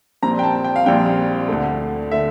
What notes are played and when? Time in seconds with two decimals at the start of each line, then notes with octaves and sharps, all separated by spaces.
0.22 A#1 A#2 G3 C4 A#5
0.39 G5
0.43 A5
0.64 G5
0.76 F5
0.85 A#1 A#2 G3 C4 G5
1.48 D2 D3 A3
2.11 D3 A3 E5